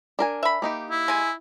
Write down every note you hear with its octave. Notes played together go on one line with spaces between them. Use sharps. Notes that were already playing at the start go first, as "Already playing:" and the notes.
D4 A#4 G#5
E5 B5
A#3 D#4 G4
E4
G#3 G#5